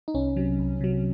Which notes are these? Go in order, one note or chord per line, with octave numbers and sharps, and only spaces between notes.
D#4
C2 C#4
C3 F#3
C2
C3 F#3